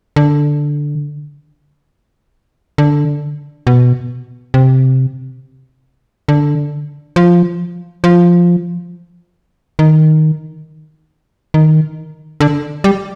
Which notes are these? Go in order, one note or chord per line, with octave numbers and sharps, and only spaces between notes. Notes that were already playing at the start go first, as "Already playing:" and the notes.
D3
D3
B2
C3
D3
F3
F3
D#3
D#3
D3
G3